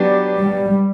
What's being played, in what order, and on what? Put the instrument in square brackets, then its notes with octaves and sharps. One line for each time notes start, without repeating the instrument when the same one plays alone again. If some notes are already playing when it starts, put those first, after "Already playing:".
Already playing: [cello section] F#3 B3 D4 G4
[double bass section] G3